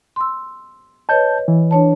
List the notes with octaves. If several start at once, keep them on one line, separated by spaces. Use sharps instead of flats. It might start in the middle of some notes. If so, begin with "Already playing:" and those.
C6 E6
B4 C#5 D#5 A5 G6
E3
D4 C#5 A5